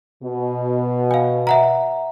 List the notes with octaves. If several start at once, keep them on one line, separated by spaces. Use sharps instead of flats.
B2
F5 G#5
E5 F#5 A#5